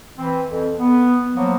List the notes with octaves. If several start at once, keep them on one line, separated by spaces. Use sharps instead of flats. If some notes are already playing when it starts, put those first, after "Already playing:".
E3 C4
F2
B3
F3 F#3 A#3 B3